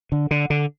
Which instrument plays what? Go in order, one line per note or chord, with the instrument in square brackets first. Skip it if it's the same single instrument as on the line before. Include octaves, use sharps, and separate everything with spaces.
[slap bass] D3
D3
D3